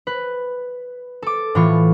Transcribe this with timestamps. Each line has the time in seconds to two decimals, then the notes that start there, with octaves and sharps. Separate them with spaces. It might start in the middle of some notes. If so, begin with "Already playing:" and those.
0.07 B4
1.22 A4 D6
1.55 A2 E3 F4 C#6